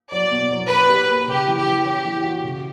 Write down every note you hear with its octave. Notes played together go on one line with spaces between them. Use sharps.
F#3 D5
B2
F#3
C#4 B4
G4
A#3
C#3 G4
E3
G4
E3
C#4 G4
E3
F#4
C#3